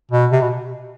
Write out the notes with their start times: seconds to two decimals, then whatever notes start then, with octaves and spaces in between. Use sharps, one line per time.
0.11 B2
0.32 C3
0.41 B2